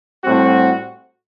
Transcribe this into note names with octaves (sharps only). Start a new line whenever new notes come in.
A2 G3 C4 F#4